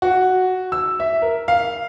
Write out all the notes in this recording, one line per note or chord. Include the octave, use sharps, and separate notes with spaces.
F#4
E6
E5
A#4
F5